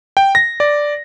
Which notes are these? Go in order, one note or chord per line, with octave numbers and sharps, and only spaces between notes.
G5
A#6
D5